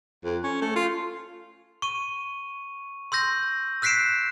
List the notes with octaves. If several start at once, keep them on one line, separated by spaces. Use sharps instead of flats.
F2
C#4
A3
F4
C#6 D#7
C6 E6 G6 A#6
E6 F#6 B6 C7 D7 E7